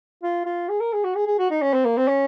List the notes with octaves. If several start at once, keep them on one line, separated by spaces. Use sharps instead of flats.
F4
F4
G#4
A#4
G#4
F#4
G#4
G#4
F#4
D#4
C#4
C4
A#3
C4
C#4